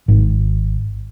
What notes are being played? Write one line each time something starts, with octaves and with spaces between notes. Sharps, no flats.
G#1